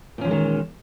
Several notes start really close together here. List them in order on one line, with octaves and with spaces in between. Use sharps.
A#2 C#4 F3 G#3 D#3